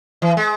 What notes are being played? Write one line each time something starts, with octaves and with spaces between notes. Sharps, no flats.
E3
G#3